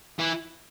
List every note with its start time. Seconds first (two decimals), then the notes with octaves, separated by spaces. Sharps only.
0.19 E3